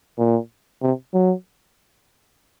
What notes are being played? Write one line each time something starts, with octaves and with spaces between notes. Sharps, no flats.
A#2
C3
F#3